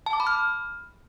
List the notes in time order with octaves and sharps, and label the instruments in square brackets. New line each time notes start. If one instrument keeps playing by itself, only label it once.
[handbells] A5
D6
B5
F6